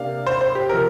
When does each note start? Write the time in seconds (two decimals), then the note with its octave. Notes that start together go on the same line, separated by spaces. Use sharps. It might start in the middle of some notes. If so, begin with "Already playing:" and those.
Already playing: C3 A#3 D4 F5
0.27 C5
0.41 C5
0.55 G4
0.69 C3 F3 A#4